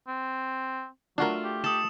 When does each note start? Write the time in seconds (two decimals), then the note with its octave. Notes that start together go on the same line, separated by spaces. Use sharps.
0.08 C4
1.18 F#3 A3 D4 F4 F#4 A#4
1.44 G4
1.64 A4 D#6 E7